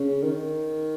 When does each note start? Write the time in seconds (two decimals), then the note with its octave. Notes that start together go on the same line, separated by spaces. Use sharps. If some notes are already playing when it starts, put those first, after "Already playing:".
Already playing: C#3
0.23 D#3